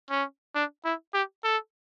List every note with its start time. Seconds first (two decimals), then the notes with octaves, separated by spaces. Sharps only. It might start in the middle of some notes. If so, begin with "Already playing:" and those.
0.10 C#4
0.55 D4
0.85 E4
1.14 G4
1.44 A4